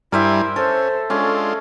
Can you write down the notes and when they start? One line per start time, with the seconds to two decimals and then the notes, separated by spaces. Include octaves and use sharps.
0.12 G2 G3 E4 A#4 C5 E5 G#5
0.56 C#4 A4 C5
1.10 G#3 C#4 D4 F4 A4